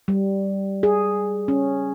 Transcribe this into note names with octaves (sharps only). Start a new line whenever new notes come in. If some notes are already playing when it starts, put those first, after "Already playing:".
G3
G#4
C#4